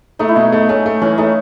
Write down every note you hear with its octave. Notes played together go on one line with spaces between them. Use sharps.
A3 D#4
E4
B2 D#4
A3 D#4
A3 C#4
A3
E3 C#4
A3 D#4